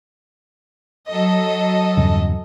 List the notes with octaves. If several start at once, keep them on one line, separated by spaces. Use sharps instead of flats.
F#3 A4 D#5
E2 G2 C#3